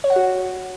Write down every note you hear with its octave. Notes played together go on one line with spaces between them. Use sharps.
C#5
F#5
F#4